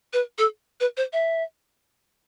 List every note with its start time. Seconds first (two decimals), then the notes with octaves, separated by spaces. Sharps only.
0.13 B4
0.38 A4
0.80 B4
0.97 C5
1.13 E5